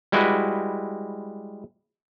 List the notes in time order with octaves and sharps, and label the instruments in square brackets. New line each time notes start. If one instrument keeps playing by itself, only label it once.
[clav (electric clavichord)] G3 G#3 E4 F#4 B4